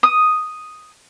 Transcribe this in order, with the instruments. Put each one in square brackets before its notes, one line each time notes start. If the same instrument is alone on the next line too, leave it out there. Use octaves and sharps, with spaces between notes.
[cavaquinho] D#6